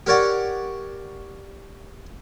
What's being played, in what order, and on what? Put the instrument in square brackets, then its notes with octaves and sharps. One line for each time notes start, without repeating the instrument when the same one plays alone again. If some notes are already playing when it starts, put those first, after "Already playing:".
[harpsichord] G4 A#4 C#5 D5 F#5